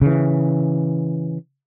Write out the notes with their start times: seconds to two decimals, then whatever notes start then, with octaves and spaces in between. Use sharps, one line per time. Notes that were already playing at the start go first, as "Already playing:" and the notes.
0.02 C#3 E3